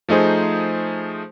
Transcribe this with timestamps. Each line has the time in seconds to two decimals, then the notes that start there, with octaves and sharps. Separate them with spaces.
0.09 F3 A3 D#4 G#4 C5